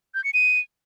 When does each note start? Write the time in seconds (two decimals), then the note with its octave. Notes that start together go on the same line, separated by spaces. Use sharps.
0.15 G6
0.24 C#7
0.34 D#7